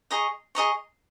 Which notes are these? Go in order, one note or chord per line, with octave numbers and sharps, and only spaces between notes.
G#4 D#5 A#5 C#6
G#4 D#5 A#5 C#6